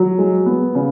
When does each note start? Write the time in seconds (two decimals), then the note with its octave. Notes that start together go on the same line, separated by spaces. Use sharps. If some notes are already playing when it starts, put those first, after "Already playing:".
Already playing: F#3
0.18 G#3
0.46 B3
0.75 C#3